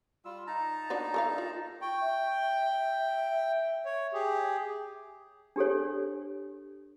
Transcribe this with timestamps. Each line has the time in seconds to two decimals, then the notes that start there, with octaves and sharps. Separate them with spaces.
0.25 G3 F4 E6
0.47 D#4 A5 A#5
0.90 D4 F#4 B4
1.14 A4 A#4 F5
1.38 F4
1.82 G5 C#6
2.01 E5
3.85 C#5
4.14 G4 G#4
5.56 D4 G4 A4 C#5